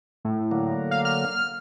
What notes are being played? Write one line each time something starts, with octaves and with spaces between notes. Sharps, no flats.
A2
D3 F#3 A#3
F5
F6